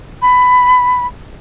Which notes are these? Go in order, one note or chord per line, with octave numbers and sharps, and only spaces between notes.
B5